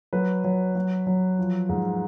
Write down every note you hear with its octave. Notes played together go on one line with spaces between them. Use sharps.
F#3 B4
F#3
F#3
F#3
F3
G#2